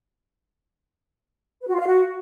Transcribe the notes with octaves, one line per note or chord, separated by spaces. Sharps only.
B4
F#4
F4
F5
F#4